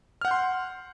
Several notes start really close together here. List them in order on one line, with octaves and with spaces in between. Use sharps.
F6 F#5 G6 C6